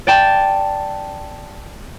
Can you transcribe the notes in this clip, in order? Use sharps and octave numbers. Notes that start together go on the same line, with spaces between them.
D5 G5 A5